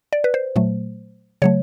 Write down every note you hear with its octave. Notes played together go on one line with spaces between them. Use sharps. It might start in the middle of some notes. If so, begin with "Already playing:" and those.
D5
B4
C5
A#2 F#3 A3
C#3 F#3 A3 C#5